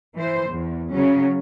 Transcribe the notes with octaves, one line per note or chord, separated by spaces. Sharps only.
E3 C5
E2
C#3 F#3 C#4